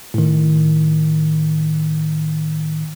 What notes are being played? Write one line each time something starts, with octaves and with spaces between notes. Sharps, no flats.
A2 D#3